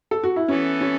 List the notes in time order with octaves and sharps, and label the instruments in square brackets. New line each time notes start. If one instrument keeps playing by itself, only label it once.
[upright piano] A4
F#4
E4
[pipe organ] E3 B3 A4 [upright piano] C#4
[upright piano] C#4